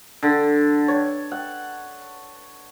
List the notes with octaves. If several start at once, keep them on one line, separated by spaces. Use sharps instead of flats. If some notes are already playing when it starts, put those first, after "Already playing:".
D3
C#5
F#5